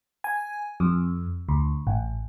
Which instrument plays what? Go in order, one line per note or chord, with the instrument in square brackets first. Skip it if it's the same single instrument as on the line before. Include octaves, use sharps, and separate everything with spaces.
[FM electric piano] G#5
F2
D2
A1